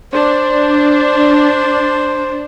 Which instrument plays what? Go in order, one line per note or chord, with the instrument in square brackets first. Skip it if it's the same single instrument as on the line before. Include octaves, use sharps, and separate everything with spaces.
[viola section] D4 [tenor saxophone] C5